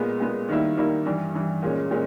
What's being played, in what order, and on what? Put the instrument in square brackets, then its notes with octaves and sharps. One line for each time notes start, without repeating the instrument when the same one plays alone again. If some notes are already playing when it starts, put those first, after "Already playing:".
Already playing: [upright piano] A#2 G#3 B3
A#2 G#3 B3
D#3 G3 A#3 E4
D#3 G3 A#3 E4
G2 E3 G3
G2 E3 G3
A#2 G#3 C#4
A#2 G#3 C#4